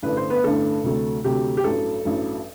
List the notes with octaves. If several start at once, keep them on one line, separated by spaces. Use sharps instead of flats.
A1 G2 D3 A3 B4
C5
B3 B4
A1 G2 D3 A3 A4
D2 C3 F#3 A3
D2 C3 F#3 A3 G4
G4
A1 G2 F#3 A4
A1 G2 F#3